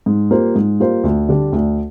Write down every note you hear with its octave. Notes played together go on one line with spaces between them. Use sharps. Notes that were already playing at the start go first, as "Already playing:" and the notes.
G#2
G3 A#3 F4 C5
G#2
G3 A#3 F4 C5
D2
D3 G3 D4
D2